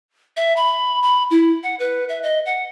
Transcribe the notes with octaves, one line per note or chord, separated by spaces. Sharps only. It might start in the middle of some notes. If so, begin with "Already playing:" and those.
E5
B5
B5
E4
F#5
B4
E5
D#5
F#5